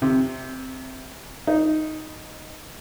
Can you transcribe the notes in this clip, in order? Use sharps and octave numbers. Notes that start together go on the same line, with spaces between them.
C3
D#4